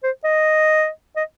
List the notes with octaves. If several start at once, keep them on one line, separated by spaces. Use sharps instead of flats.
C5
D#5
D#5